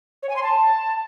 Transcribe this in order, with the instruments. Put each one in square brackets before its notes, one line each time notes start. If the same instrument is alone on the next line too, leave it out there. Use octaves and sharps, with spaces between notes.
[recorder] C#5
G#5
C6
A5